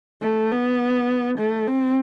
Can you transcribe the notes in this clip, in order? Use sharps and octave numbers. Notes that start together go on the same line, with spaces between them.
A3
B3
A3
C4